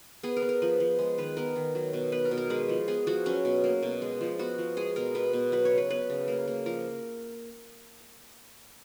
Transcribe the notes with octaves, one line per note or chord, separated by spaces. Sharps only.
B3 G#4
A#4
B3
A#4
F3 B4
F3
G#3
D#3 B4
B3 A#4
D#3
F#3
B2
B3 B4
A#4
B2
A#4
G#3 B4
F3
B3 G#4
F3 F#4
F#3 C#4
B2
A#3
B2
G#3
F3
B3 F#4
F3
G#3 G#4
B2 A#4
B3 B4
B2
F#3 B4
C#5
C#3
B4
B3 B4
C#3
A#3
A#3
F3 A#4